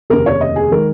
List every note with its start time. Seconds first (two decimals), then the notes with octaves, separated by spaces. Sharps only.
0.10 F1 D#2 C#3 A#4
0.26 C#5
0.41 D#5
0.56 G#4
0.71 D#3 G#3 A#4